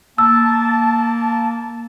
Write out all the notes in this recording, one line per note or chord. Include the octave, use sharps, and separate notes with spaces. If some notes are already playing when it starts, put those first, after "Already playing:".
A#3 A5 E6